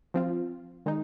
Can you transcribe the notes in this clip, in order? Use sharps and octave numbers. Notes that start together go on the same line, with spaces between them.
F3 C4 F4
D#3 G#3 D#4